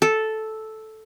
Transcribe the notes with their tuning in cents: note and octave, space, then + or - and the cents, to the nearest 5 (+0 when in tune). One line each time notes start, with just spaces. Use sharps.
A4 -5